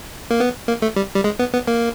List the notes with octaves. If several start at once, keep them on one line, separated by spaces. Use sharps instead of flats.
A#3
B3
A#3
A3
G3
G3
G#3
B3
B3
A#3